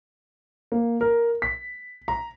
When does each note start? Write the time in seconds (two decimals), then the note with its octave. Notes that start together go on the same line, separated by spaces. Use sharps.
0.72 A#3
1.01 A#4
1.42 B6
2.08 A#5